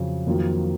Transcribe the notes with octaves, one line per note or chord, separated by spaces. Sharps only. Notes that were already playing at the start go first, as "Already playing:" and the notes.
Already playing: F2 C#3 F#3
F2 D#3 F#3 A#3 F4